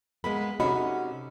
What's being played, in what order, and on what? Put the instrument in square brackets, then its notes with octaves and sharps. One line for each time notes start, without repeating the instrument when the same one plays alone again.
[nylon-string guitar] G#3 A#3 B3 [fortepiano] B5
[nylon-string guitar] C3 F#4 [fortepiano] C#4 D#4 [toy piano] A4 F#5 B5